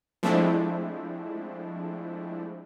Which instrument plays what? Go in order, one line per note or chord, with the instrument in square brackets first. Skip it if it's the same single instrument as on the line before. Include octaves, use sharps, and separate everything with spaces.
[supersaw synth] F3 G#3 A3 C4 D4 E4